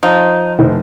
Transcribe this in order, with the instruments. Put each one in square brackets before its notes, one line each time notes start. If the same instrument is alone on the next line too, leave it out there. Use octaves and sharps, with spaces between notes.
[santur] F3 [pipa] D#4
[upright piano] F1 C5